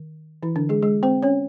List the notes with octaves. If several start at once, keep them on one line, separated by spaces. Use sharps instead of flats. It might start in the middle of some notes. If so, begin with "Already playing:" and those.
Already playing: D#3
E3 E4
D3 D4
G#3 G#4
G#3 G#4
C4 C5
C#4 C#5